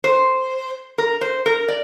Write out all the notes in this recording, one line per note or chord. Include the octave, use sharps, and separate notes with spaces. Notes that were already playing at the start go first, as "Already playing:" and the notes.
C5
A#4
C5
A#4
D5